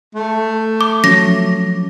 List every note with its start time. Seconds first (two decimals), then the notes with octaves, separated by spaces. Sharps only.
0.15 A3
0.81 D6
1.04 F3 F#3 C#4 A#6